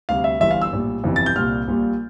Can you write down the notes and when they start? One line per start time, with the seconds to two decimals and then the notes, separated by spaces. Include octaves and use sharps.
0.09 D2 C3 G3 F5
0.24 E5
0.40 G1 G2 E3 G3 E5
0.51 F5
0.61 E6
0.73 A#1 A2 G3
1.04 G1 F2 C3 E3 G3
1.16 A6
1.26 G6
1.36 C2 A#2 G3 F6
1.67 A#1 A#2 G3